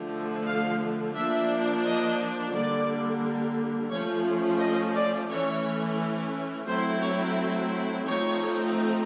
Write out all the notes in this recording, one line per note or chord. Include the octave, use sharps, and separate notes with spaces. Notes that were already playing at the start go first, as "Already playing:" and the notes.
Already playing: D3 F3 A3
F5
F3 A#3 D4 E5
D#5
D3 G3 A#3 D5
F3 A3 C#4 C#5
D#5
D5
E3 A3 C#4 C#5
F#3 A3 C4 E4 C5
C#5
F3 A3 C4 D#4 C#5